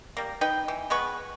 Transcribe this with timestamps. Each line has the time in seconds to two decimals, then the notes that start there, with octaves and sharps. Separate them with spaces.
0.17 G3 A#3
0.41 D#4 B4 G5
0.68 E3
0.90 G#3 B3 B4 C#6